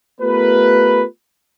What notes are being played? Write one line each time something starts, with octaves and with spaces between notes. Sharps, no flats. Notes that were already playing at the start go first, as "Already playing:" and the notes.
A3 B3 F4 G4 A#4 B4